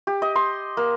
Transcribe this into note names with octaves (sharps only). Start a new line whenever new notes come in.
G4
D#5
C6
A#3